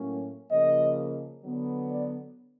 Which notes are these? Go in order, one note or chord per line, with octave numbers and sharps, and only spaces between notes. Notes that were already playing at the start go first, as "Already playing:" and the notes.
Already playing: A2 F#3 A#3 C#4
C#3 F3 A#3 D#5
D3 F#3 B3
D5